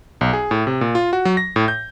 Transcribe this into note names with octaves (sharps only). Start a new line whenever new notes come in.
B1
G#4
A2
C3
A#2
F4
F#4
F#3
A#6
A2
G6